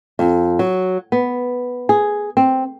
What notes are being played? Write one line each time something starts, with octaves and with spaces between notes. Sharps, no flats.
F2
F#3
B3
G#4
C4